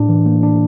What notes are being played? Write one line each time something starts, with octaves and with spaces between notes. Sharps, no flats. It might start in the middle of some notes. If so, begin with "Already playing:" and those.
Already playing: A2 D4
E3
A#3
D4